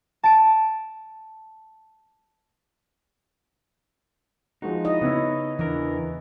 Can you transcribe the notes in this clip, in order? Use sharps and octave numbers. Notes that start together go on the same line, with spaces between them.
A5 D7
F3 G#3 D#4 F#4
E4 D#5
C#3 B3 C#4 E4
E2 E3 D4 A#4